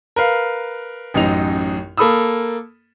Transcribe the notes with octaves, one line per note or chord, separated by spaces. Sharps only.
A#4 B4 F5
A1 F#2 D#4 F7
A#3 A4 B5 D#6 E6